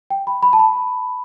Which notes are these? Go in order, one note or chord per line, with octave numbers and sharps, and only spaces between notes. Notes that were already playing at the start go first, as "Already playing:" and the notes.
G5
B5
B5
A5
B5